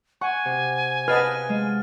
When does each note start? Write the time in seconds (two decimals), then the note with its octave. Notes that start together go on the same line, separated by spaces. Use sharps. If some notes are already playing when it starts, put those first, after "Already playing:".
0.21 F#5 G#5 C#6
0.45 C3
1.08 B4 D#5 F5 F#5 A5 B5 F6 A6
1.49 G#3